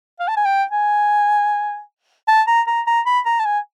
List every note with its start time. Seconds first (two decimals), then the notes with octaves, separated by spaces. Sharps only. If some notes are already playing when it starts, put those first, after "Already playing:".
0.20 F5
0.28 A5
0.37 G#5
0.45 G5
0.71 G#5
2.28 A5
2.47 A#5
2.67 A#5
2.87 A#5
3.06 B5
3.26 A#5
3.40 A5
3.45 G#5